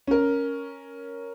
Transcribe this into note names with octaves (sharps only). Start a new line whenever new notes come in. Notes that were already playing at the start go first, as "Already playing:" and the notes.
C#4 A#4